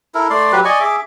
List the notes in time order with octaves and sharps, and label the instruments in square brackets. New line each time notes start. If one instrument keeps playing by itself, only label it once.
[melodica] E4 A4 A#4
A3 D5 C6
F#3 G4 B4
D5 D#5 G#5 C#6
G#4 E5 D6